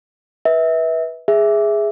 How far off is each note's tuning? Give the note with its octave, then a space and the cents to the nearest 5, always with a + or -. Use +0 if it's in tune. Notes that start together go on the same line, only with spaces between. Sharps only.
B4 -15 E5 -25
G#4 +0 E5 +0